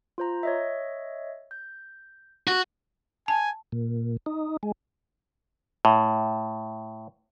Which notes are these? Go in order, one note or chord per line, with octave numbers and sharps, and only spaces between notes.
F4 C5 A#5
C#5 D#5 E5
G6
F#4
G#5 A5
A#2
D#4
G#3
A2